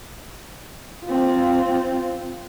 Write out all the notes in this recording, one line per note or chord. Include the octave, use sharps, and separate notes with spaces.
C4 F4